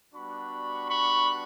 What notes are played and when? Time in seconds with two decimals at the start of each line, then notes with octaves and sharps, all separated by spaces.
0.14 G3 B3 D4 F#4 B5 C#6
0.89 B5 C#6